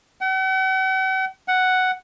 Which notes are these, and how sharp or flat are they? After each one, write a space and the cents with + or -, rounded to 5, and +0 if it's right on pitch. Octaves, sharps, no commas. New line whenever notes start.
F#5 +45
F#5 +5